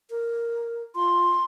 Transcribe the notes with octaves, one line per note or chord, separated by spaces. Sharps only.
A#4
F4 C6